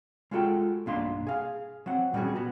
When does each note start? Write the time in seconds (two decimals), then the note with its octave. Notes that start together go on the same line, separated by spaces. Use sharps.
0.31 G#3 F4 F#4 A4 F5 G5
0.86 B1 G2 A#3 D4 F5 C6
1.27 G#4 F5
1.86 F#3 C4 F#5
2.13 A#2 G3 B3 C#4 F#4 G#4
2.35 B3 F#4